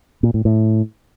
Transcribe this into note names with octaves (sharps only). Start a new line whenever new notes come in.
A#2
A2
A2